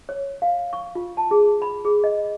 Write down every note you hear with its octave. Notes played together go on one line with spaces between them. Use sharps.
C#5
F5
C#6
F4
A5
G#4
B5
G#4
D#5